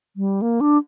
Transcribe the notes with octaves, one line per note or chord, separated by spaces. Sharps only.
G3
A#3
D4